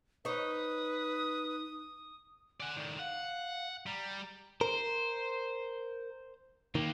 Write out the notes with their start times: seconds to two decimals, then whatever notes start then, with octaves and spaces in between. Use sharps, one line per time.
0.25 D#4 B4 C#5 D#6
2.60 D5 F#5 G#5
2.76 A2 D#3 D5
2.99 F5 F#5
3.86 G3 A#5
4.61 A#4 C5
6.75 D#3 A#3 G4